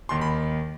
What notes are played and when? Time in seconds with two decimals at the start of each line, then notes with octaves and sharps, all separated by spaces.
0.09 D#2 D#3 C6
0.21 B5